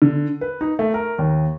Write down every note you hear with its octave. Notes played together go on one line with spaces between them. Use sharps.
D3
B4
D#4
A3
A#4
D#2